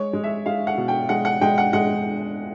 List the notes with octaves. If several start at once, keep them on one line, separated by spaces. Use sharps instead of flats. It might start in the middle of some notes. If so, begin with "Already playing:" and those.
Already playing: G#3 C#5
G#3
E5
G#3 F5
F#5
B2
G5
G#3 F#5
F#5
G#3 G5
F#5
G#3 F#5